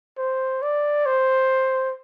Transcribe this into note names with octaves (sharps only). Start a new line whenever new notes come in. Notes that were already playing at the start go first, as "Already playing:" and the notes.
C5
D5
C5